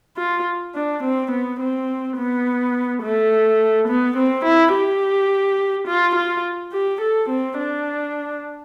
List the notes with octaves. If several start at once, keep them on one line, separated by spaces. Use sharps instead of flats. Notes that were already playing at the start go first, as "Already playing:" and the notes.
F4
D4
C4
B3
C4
B3
A3
B3
C4
E4
G4
F4
F4
G4
A4
C4
D4